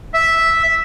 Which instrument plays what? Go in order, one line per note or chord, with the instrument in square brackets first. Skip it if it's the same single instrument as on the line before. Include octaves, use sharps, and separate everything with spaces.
[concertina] E5